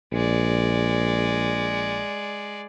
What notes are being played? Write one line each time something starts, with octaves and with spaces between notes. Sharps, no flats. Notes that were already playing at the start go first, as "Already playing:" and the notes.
A#1 G#3 D5